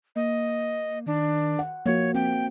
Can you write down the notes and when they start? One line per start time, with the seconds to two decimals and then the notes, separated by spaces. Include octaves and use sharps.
0.16 A#3 D#5
1.06 D#3 D4
1.59 F#5
1.86 F3 A#3 F#4 C#5
2.15 C4 G5